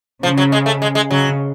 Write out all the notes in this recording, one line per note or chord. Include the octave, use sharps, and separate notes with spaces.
C#3 F3
F#3
G#3
A3
G#3
G#3
C#3 F#3